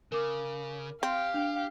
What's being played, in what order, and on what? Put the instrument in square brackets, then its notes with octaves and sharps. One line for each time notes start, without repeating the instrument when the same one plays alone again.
[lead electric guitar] C#3 [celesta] A#4 D6
[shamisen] C4 [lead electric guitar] G4 [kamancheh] F5
[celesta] D4 F7